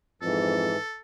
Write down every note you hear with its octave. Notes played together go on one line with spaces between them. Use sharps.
F2 G#2 E3 A4